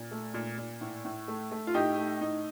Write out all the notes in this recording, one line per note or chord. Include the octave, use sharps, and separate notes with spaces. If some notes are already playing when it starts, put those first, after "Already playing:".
Already playing: A#2
A3
A#2
A#2
A2
A2
A3
A3
F4
A2 D#4 G4
A3
A2 D#4